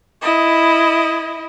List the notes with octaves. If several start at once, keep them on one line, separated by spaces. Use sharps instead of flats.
E4 D#5